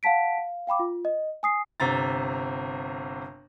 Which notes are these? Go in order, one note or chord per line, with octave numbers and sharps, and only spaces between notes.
F5 F#5 A5 B6 D7
F5
F5 G5 B5 D6
F4
D#5
G#5 D#6 C7
G1 C3 A#5 A6